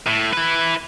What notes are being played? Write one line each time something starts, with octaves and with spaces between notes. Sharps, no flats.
A2
E4 B4